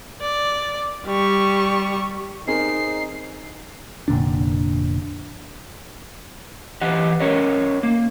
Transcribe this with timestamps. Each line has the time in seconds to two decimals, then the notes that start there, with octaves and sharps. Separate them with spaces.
0.22 D5
1.06 G3 C#6
2.47 C4 D#4 G#4 A#4 C7
4.08 F1 A#2 D3 D4
6.81 E3 G4 D#5 F#5
7.20 C#4 A#4 C#5 D#5
7.83 A#3